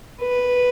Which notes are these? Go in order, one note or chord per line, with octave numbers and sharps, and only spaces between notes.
B4